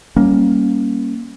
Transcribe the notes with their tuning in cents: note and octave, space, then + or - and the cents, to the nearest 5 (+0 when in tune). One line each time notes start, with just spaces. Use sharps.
G3 +0 A#3 +10 C#4 +0